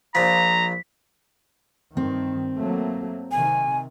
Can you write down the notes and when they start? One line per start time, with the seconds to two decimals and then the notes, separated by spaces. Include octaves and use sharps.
0.15 A#1 F3 A#5 B6
1.97 G2 D#3 C4
2.57 F#3 A3 A#3
3.31 C3 D#3 G#5